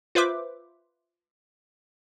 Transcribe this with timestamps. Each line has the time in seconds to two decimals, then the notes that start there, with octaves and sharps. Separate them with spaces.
0.15 F4 B4 C5 E5 D6